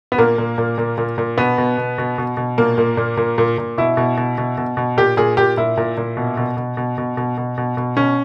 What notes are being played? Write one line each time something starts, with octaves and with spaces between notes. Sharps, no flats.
B3
A#2 A#3
A#2
A#2
A#2
A#2
A#2
B2 B3
B2
B2
B2
B2
B2
A#2 A#3
A#2
A#2
A#2
A#2
A#2
B2 E4
B2
B2
B2
B2
B2
A#2 G4
A#2 G#4
A#2 G4
A#2 E4
A#2
A#2
B2
B2
B2
B2
B2
B2
B2
B2
B2
B2 C#4